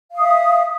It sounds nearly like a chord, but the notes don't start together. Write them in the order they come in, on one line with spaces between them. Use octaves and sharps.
F5 D#6 E5